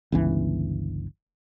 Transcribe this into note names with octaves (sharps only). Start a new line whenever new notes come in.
G1 C#2 E3